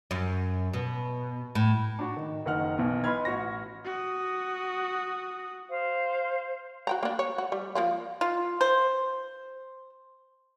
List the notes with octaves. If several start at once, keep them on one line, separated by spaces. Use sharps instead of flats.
F#2
B2
A2
D4 F#4
D#3
F#1 D#3 F#5 F6
B1 B2 E3
B4 D#5 B5 C6 F6 G#6
A1 F#4 C#6 A#6
F#4 D#6
C5 F5
F#4 G5 A#5
A#3 D4
C#5
F#4
G3
F3 A#3 F4
F4
C5